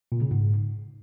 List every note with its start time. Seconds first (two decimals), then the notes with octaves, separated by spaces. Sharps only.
0.12 A#2
0.22 C#3
0.31 G#2